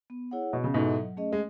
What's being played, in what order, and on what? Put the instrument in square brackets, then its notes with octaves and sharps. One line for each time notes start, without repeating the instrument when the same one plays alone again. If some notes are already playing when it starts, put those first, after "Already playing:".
[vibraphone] B3
E4 G#4 C#5 F#5
[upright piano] B2 [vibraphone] B3
[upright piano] C#3
[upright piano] G#2 B2 [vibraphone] E4 A4 E5
[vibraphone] F#3
A3 C#4 G#4 D#5
[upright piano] G#3